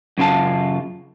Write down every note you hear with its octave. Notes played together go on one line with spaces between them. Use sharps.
F#2 C#3 F4 A5